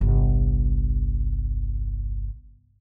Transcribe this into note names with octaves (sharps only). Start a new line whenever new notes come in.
G1 C2